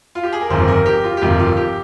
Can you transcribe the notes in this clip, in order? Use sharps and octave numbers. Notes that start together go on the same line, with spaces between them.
F4
G4
G#4
A#4
G1 F2 C3 D#3 C5
A#4
G4
F4
G4
G1 F2 C3 D#3 F4
F4
G4